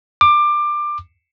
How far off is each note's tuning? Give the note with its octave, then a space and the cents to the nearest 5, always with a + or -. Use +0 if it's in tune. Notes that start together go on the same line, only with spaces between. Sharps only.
D6 +20